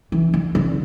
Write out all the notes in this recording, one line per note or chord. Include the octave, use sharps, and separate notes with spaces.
E3
D3
D3